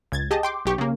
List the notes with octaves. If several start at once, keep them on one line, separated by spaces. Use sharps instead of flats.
C#2 G#6 A6
G4 G#4 D#5 A5
G5 C6 D6
B1 G4 C#6
C#3 A#3